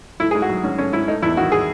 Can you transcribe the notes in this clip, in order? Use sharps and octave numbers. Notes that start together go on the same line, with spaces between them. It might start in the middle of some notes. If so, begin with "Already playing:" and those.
A3 E4
G#4
G#2
F#4
F#3
G#2 C#4
A3 C#4
G#2 E4
A3 D#4
E2 E4
D#3 F#4
G#4